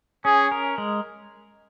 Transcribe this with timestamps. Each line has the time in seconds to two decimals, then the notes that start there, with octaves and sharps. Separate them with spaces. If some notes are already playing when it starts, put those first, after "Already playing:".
0.25 C#4 G#4
0.52 A#4
0.78 G#3